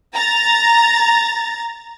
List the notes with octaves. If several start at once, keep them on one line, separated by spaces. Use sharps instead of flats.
A#5 A6